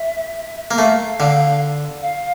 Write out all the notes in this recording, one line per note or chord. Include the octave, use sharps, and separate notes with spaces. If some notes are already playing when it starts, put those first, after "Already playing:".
Already playing: E5
A#3
A3 F5
D3 F5
F5